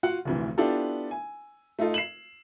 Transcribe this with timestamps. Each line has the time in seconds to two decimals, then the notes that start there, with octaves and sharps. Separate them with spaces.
0.03 F4 F#4 F#5
0.25 F1 D2 E3
0.58 B3 D4 E4 F4 G4 A4
1.11 G#5
1.79 A3 D#4 F4 A4
1.94 C7 E7 F#7